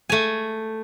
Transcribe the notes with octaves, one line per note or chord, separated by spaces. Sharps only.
A3 G#5